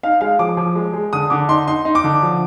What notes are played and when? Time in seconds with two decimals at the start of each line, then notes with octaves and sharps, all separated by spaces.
0.03 D#4 F5
0.21 G#3 F5
0.39 F3 D6
0.57 F3
0.75 G#3
0.94 G#3
1.13 D3 D#6
1.30 D3 D6
1.49 D#4 C6
1.67 D#4 C6
1.85 D#4
1.95 D6
2.04 D3
2.23 F3